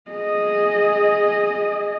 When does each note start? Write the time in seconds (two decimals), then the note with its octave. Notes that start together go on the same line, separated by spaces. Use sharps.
0.10 G#4 D#5